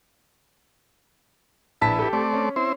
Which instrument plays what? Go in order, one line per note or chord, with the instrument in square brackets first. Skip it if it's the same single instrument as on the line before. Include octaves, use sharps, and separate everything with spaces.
[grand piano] A#1 A5 B6 [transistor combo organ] E4 B4
[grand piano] G4 A4
[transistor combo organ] A3 C4 D5
[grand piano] C#4
[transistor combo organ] C4 E4 C5